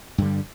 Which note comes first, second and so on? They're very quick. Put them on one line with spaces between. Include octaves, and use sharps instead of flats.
G2 D3 G3